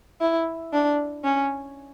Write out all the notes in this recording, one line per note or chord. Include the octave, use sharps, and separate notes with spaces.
E4
D4
C#4